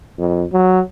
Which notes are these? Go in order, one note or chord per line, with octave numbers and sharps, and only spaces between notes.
F2
F#3